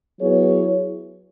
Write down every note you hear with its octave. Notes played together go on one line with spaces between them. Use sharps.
F#3 B3 E4 G#4 C#5